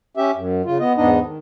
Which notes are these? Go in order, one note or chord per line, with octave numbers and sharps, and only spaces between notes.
C#4 G4 E5
F#2
C#3 F4
B3 D#5
E2 G#2 B3 D4 D#4 D#5
D#3